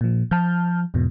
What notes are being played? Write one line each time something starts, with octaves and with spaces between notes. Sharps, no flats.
A#2 F3
F3 A5 F6 G6
E2 G#2 B2